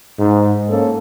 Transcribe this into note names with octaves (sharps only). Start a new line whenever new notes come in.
G#2
A#3 C#4 A4